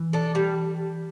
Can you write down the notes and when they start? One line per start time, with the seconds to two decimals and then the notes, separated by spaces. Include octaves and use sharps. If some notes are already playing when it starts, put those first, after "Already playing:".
Already playing: E3
0.13 D4 A4
0.35 G3